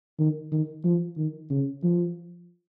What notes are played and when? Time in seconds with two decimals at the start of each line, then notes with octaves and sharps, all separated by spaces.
0.19 D#3
0.52 D#3
0.84 F3
1.17 D#3
1.50 C#3
1.83 F3